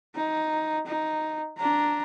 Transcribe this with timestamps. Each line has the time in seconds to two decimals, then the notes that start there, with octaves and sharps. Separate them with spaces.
0.15 D#4
0.86 D#4
1.58 D4 A#5